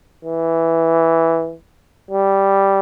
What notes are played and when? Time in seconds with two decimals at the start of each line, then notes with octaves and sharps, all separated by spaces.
0.25 E3
2.11 G3